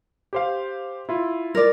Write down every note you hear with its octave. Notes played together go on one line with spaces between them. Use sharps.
G4 C5 F5
E4 F4
A#4 D5